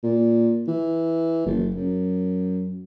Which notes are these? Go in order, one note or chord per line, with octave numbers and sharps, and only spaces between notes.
A#2
E3
F#1
F#2